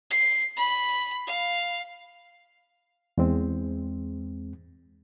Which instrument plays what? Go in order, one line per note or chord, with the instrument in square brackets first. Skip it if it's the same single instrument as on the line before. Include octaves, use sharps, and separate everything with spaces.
[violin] C7
B5
F5
[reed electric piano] E2 G#3 C4